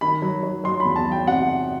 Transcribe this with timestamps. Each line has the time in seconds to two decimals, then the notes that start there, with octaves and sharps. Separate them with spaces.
0.01 D#3 B5
0.22 F#3
0.43 F#3
0.64 F#3 C6
0.80 E2 B5
0.96 A5
1.06 F#3
1.12 G5
1.27 C3 F#5